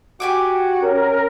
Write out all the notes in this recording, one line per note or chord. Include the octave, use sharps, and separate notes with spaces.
F#4 G4 G#5 D6
C#4 A#4